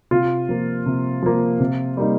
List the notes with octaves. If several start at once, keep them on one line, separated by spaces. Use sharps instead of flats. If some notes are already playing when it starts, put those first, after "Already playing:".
C3 F4
F3 A#3
C3
F3 A#3
C3
G3 A#3 D#4